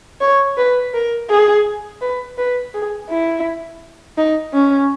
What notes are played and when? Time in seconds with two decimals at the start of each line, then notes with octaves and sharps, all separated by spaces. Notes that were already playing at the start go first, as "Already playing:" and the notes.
0.21 C#5
0.57 B4
0.94 A#4
1.30 G#4
2.01 B4
2.37 B4
2.74 G#4
3.09 E4
4.18 D#4
4.53 C#4